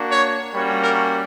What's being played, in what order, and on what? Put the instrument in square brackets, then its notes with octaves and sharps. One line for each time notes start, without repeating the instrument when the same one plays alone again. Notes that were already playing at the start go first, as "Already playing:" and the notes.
Already playing: [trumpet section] A#3 D4 F#4
C#5
G3 A#3 C#4 F#4 C#5
A#4